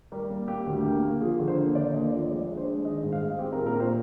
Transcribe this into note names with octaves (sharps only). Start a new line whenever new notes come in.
G3 A#4
A#3
A#3 G4
D2
A#3
A#3
F3 G#4
D3
C5
A#3
D3 D5
D#2 D#5
F3 D5
G#3 D5
D4
C5
G#3
D#3 D#5
G#2
F5
G#3
C4 G4
A#4
A#2
A#4
A#2 C5